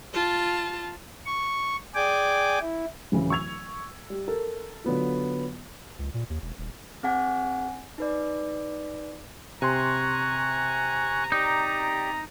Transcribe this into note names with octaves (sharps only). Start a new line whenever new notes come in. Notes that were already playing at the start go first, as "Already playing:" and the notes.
F4 A5
C#6
G#4 D5 G5 G#5 D6
E4
D1 C#3 E3 E4
C#6 E6 G#6 F7
G3
A4 A#4
D3 F#3 B3 F4
C#2
A#2
D#2
E1
D#1
C4 G#4 F#5 G#5
D#4 B4 D5
C3 G#5 A#5 C6 C#6 F#6
D#4 G4 D5